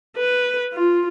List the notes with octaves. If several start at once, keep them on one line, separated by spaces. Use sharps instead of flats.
B4
F4